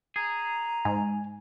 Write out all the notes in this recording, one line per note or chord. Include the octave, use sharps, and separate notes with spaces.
G#4 A#5
G#2 G#5